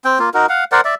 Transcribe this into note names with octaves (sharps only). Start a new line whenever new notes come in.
C4 G5
A#3 F4
D#4 F#4 A#4
F5 F#5
A#4 C5 D5 F#5
D5 E5